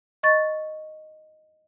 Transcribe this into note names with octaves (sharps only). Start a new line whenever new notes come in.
D#5 C#6 A6